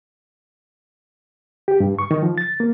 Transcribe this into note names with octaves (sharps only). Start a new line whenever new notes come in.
G4
G2
C#6
D#3
F3
A6
A#3